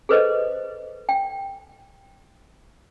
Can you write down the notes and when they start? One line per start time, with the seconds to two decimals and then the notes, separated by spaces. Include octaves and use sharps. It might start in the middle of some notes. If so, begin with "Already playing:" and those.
0.09 G#4 A4 B4 C5 D#5
1.09 G5